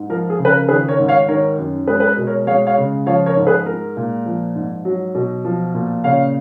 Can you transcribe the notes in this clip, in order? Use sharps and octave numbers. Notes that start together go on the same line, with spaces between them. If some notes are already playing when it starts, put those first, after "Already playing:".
Already playing: G#2
F3 A#4
G#4
C#3
B4
A#4
D#3 G#4 B4
A#4 C#5
G#2
C#5 F5
D#3 A#4 C#5
F#2
G#3 G#4 B4
B4
A#4
B2
A#4 C#5
G#3 C#5 F5
C#5 F5
C#3
F3 C#5 F5
A#4 C#5
G#2
G#4 B4
G#3 A#4
A#2
F3
G#2
F#3
B2
F3
A#2
C#3 C#5 F5